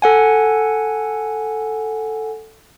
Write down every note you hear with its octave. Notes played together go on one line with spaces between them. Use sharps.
A4 F#5 G#5